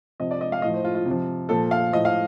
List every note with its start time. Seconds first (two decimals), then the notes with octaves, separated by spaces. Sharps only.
0.20 C3 F3 D#5
0.31 D5
0.41 D#5
0.52 F5
0.62 A2 F3 D#5
0.74 C5
0.84 F4
0.95 F4
1.05 C3
1.11 F3
1.49 A#2 F3 A4
1.71 F5
1.92 A2 F3 D#5
2.05 F5